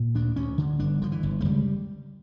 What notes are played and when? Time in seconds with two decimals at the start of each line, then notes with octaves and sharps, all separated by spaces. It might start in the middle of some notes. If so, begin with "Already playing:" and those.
Already playing: A#2
0.15 D2 D4
0.36 D2 C#4
0.58 D3
0.80 G1 D4
1.02 D3 F3
1.12 E3
1.23 G1
1.40 A3
1.45 C#2 G3